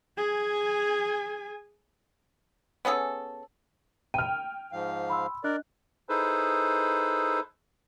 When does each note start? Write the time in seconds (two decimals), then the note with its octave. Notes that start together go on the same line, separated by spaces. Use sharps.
0.18 G#4 G#5
2.85 B3 C#4 G#4 A4
4.14 G5 F6 D#7
4.72 G#2 F3 F5
5.10 B5 C6 E6
5.44 D4 A#4 D5 D#5 F#6
6.09 D#4 E4 G#4 A4 B4 C5